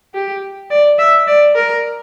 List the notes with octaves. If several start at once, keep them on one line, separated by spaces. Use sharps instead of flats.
G4
D5
E5
D5
A#4